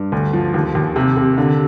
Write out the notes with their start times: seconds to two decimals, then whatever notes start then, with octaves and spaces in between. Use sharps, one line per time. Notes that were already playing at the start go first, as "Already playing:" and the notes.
Already playing: G2
0.12 D2
0.33 F3
0.54 D#2
0.75 D#2
0.96 C3
1.17 C3
1.38 D3